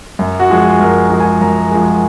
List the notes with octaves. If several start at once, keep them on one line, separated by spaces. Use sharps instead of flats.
F#2
F#4
F3 G#3
G#4
F#2 A#4
F3 G#3
G#5
F#2 A#5
F3 G#3